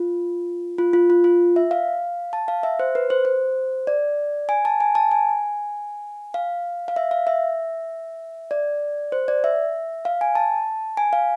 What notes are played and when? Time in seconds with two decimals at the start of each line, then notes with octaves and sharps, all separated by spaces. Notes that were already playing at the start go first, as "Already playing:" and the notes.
Already playing: F4
0.78 F4
0.93 F4
1.10 F4
1.24 F4
1.56 E5
1.71 F5
2.33 A5
2.48 F5
2.63 E5
2.80 C5
2.95 B4
3.10 C5
3.25 C5
3.87 D5
4.49 G#5
4.65 A5
4.80 G#5
4.95 A5
5.11 G#5
6.34 F5
6.88 F5
6.96 E5
7.11 F5
7.27 E5
8.51 D5
9.12 C5
9.28 D5
9.44 E5
10.05 F5
10.21 G#5
10.35 A5
10.97 G#5
11.13 F5